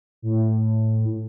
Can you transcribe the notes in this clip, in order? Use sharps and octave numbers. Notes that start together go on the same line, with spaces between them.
A2